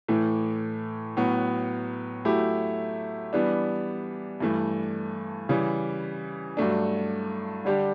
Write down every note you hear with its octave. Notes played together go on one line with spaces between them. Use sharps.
A2 E3 A3
A2 F#3 B3 F#4
F#3 A3 E4 G4
E3 G3 B3 D4
G2 E3 A3
C#3 E3 G3
G2 F#3 A3 D4
D3 G3 D4 G4